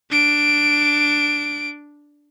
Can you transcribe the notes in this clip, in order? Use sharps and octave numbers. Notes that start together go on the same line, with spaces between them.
D4 D7